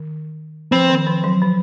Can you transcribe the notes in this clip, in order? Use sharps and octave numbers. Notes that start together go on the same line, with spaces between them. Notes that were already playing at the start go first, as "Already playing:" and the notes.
Already playing: D#3
F3 C4
D#3
F3
F#3
F3